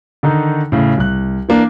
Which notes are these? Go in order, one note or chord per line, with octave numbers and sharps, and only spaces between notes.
D3 D#3 D#4
A2 C#3
C2 F#6
E3 A#3 D4